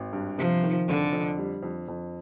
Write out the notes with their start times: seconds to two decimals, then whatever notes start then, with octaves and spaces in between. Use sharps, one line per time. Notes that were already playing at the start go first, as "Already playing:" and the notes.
Already playing: G#1
0.13 G2
0.38 C3 F3
0.63 D#3
0.88 F1 D3
1.13 F2
1.38 G3
1.63 F2
1.88 F2